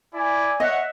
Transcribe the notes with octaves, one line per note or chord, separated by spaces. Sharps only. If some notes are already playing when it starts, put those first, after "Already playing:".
E4 D5 G#5
C#5 D#5 E5 F#5